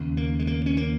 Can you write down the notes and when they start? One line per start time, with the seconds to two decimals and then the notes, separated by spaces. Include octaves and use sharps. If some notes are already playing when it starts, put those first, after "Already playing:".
Already playing: D#2 C#3
0.17 A#3
0.39 G#3
0.47 A#3
0.66 C#4
0.77 A#3